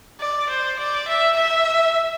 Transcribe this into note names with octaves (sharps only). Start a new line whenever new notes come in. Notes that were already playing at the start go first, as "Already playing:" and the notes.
D5
C5
D5
E5
E5